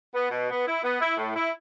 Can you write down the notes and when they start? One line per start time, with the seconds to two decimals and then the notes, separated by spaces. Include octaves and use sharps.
0.14 B3
0.31 B2
0.49 B3
0.66 E4
0.84 B3
1.00 E4
1.17 A2
1.35 E4